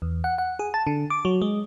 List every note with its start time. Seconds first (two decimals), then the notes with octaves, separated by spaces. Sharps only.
0.02 E2
0.24 F#5
0.38 F#5
0.59 G#4
0.74 A5
0.87 D3
1.10 D6
1.25 F#3
1.42 G#3